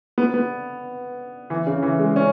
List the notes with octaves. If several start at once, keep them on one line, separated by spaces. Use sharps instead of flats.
B3
B3
E3
C#3
E3
G#3
C#4